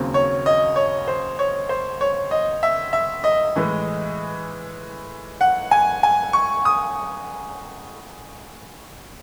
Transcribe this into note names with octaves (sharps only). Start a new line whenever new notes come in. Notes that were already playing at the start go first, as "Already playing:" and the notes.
Already playing: D#2 C#3 F#3 C4
C#5
D#5
C#5
C5
C#5
C5
C#5
D#5
E5
E5
D#5
A2 E3 G#3
F#5
G#5
G#5
C#6
D#6